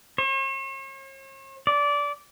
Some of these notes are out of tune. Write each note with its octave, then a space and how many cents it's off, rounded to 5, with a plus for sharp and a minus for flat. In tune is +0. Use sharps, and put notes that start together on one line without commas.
C#5 -45
D5 -20